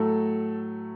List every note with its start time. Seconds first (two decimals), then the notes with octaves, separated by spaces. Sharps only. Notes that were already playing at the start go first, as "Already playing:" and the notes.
Already playing: A2 F#3 A3 A4